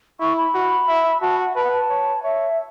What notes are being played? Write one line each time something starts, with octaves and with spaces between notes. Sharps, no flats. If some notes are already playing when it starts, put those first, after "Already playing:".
E4 C#6
B5
F#4
E5
F#4 A5
F#5
B4 A5
F#5
A5
C#5
C#5 E5